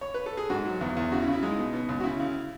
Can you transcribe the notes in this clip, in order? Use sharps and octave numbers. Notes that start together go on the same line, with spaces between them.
C#5
B4
A4
G#4
G#2 F#4
F#3
E2
E2
C#3 F#4
E4
C#3
E4
G#3 D#4
B2
B2
C#2
F#4
C#3 E4
C#3